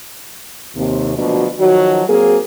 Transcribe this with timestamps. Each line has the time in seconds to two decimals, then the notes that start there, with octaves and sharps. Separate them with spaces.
0.75 D#2 C3
1.16 D2 B2 F3 F#3 D4 D#5
1.58 D#3 F3 F#3 F#4
2.07 F#3 A#3 C4 G#4